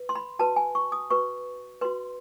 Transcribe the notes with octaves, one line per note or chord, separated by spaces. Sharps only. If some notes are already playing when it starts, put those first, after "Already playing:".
Already playing: B4
C6
B5
F#4 B4 A5
G#5
C#6
D#6
F#4 B4 C#6
F#4 B4 C6